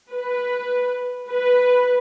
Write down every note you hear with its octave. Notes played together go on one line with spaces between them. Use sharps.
B4
B4